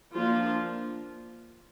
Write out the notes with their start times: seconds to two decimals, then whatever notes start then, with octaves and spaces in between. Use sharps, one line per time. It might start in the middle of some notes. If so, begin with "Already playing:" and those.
0.14 F3 A#3 D4 F4